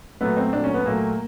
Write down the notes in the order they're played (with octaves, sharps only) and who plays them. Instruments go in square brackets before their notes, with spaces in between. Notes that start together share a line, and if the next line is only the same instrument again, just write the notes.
[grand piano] A#2 F#3 A3 B3
C4
A#2 F#3 A3 D4
C#4
B3
A#2 F#3 A3 A#3